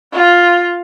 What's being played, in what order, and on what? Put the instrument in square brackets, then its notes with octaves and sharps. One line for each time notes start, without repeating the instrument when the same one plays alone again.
[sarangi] F4